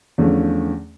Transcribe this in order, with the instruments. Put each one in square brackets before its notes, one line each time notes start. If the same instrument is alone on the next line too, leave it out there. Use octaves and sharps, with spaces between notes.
[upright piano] E2 D3 F3 A3 C#4